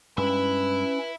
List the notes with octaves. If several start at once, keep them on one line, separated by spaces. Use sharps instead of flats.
G2 G#3 C#4 B4 E5 B5